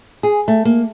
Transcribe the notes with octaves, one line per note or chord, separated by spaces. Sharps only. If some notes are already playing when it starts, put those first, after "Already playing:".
G#4
A3
A#3